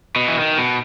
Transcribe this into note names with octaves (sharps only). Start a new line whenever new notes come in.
B2
E3
D#3
B2